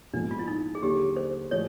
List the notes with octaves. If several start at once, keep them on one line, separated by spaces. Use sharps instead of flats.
A#1 G#2 F3 G#3 B3 D4
F4
E4
D#4
G#4
D#2 D3 F#3 G4
C5
A2 F3 G#3 C#5